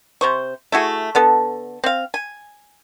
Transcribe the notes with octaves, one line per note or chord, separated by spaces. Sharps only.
C3 C5 C#6
A3 E4 F#4 G#4
D3 B3 A4
C4 F5
G#5